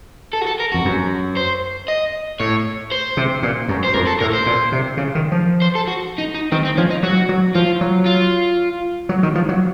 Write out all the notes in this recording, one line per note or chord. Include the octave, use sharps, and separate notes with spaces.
A4
F#4
A4
A#4
F2 F#4
F#2
C5
D#5
A2 C#5
C5
C3
A#2
F#2
C5
F2 A#4
A4
A2 A#4
C5
A#2
C3
C#3
D#3
F3
C5
A4
F#4
D#4
D#4
D#3 C4
C4
F3 C#4
D#4
F#3 F#4
F#3
F3 F4
F#3
F4
F#3
D#3
F3
F#3